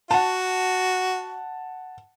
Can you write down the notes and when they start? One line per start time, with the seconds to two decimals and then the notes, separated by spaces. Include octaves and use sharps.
0.11 F#4 F#5 A5